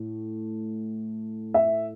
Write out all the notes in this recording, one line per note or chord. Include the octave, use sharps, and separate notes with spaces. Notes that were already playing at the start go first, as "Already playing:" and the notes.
Already playing: A2 A3
E5